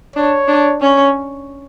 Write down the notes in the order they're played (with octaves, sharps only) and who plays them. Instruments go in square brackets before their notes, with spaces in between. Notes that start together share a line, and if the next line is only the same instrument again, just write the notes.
[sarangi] D4 [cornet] C#5
[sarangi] D4
[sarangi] C#4 [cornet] C#5